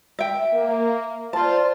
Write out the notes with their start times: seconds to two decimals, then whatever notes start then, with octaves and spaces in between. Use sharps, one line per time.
0.19 E5 G5
0.53 A#3
1.33 F4 C5 D5 A5